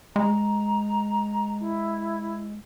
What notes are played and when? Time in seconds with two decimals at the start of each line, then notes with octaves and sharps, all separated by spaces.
0.16 G#3 A#5
1.60 E4